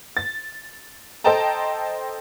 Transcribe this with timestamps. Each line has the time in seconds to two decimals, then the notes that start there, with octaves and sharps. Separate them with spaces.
0.17 A6
1.24 A4 C5 D#5 G5 A5 A#5